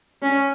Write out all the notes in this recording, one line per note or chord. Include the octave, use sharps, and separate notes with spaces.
C#4